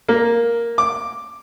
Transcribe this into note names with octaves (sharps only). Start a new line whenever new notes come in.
A#3
D6